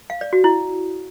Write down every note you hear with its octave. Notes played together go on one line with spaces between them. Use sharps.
F5
D5
F#4
E4